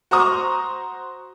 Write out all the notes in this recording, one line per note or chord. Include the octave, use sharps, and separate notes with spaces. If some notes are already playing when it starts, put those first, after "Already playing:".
F#4 C5 A#5 C#6 D#6